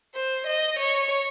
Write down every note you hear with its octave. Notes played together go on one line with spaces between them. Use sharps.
C5
D#5
C#5